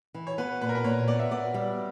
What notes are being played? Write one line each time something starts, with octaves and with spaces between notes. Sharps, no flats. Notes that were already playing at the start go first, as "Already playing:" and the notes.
E3
C#5
B3 B4
A#2 B4
A#4
B4
A#2 C#5
B3 D5
E5
B3 D5
G3